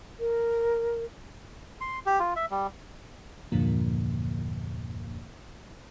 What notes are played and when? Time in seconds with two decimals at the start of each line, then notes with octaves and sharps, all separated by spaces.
0.20 A#4
1.81 C6
2.06 G4
2.20 F4
2.36 E5
2.51 G3
3.52 E2 G2 A#2 D3 F3 A#3